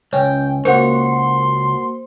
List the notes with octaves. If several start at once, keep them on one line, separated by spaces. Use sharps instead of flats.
C#2 C#4 G5
C#2 A#3 F#4 C5 C6